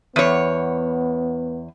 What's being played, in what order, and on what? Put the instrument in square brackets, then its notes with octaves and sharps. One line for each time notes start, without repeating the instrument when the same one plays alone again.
[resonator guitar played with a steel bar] E2 C#5 [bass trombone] B3